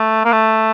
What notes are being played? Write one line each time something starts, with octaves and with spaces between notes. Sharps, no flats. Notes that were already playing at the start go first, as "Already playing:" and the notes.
Already playing: A3
A#3
A3